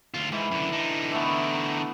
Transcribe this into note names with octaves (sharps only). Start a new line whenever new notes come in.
D2 F4
G#2 E3
F#2 D3
D3 D#4
E3 A3 B3